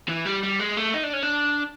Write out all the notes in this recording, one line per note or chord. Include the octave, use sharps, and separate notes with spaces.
E3
G3
G3
G#3
A3
D#4
D4
C#4
D4